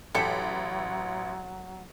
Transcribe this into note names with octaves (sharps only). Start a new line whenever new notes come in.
A1 F#3 G4 A4 B6